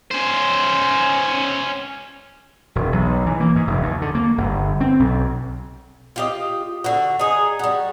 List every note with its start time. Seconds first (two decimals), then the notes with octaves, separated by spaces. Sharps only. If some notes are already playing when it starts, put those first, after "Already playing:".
0.11 C#4 C5
2.75 E1
2.92 B1
3.26 E3
3.40 A#3
3.56 G#2
3.67 F1
3.81 D#2
4.02 D3
4.15 A#3
4.38 G1
4.81 C4
5.00 B1
6.16 F4 G4 D#5
6.84 D3 F#4
7.19 D#4 G#4
7.59 G3 F#4